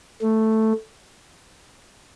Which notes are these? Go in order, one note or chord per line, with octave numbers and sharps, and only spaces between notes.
A3